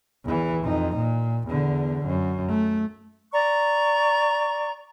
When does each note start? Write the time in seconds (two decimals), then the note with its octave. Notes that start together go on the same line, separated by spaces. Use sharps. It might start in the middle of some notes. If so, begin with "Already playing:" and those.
0.25 E2 E3
0.63 F2 D#4
0.96 A#2
1.48 E2 D3
2.06 F#2
2.49 A3
3.32 D5 A#5 C#6